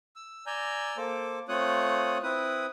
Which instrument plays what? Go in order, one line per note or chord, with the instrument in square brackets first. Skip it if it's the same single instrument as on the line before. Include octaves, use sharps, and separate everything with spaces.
[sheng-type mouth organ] E6
D5 G#5 A#5 E6 G6
A#3 A4 C5 D6
A3 C4 F4 C#5 D#6 F#6
C4 E4 B4 D#6